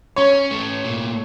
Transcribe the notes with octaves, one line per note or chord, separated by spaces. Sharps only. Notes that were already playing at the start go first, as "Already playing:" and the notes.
C#4 C#5
A3
A#2